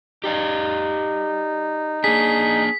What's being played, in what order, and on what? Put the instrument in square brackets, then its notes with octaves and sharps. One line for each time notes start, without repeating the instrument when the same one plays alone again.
[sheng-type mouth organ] D#4 [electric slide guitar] G4 D5 F5
[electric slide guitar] A#3 D4 [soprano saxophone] G#4 [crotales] B6